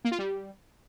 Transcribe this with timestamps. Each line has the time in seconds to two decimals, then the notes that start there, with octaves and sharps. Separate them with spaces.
0.05 A#3
0.12 F4
0.19 G3